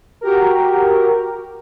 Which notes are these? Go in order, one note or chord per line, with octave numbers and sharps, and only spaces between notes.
F#4 G4 A#4